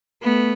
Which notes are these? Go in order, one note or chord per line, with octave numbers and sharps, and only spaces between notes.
A3 B3